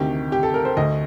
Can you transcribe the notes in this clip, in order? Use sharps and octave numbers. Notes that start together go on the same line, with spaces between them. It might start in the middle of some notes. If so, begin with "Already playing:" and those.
Already playing: D2 C3 D#3 G4
G4
A4
A#4
C5
D2 D3 D#5